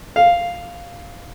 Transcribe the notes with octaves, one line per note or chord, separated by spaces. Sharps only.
F5